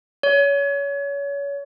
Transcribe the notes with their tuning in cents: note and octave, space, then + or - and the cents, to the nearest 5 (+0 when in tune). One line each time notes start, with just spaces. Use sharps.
C#5 +30